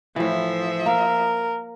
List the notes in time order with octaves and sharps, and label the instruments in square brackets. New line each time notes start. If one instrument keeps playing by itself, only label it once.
[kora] A2 E3 [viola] F3 E5
[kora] A#3 [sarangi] A#4